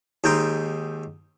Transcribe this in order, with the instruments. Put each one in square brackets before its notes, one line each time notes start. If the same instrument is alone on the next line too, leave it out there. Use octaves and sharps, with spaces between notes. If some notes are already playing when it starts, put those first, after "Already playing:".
[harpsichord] D#2 G#2 D#4 G5 A#5 C6